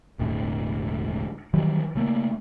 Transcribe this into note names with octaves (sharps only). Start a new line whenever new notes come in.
E1 A1 A2 D3
D#3 E3 F#3 G3
C#3 A3 A#3